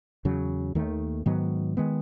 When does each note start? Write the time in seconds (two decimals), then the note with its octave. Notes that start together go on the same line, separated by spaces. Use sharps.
0.25 E2 C#3 F#3
0.75 D#2 D#3 A3
1.26 G#2 D#3 F#3 B3
1.77 D#3 G#3 B3